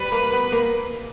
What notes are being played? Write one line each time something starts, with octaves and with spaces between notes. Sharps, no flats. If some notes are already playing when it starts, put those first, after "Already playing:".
Already playing: G3 B4
A#3
B3
A#3